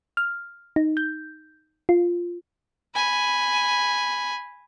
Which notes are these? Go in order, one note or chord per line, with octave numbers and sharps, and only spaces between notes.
F6
D#4
G6
F4
G#5 B5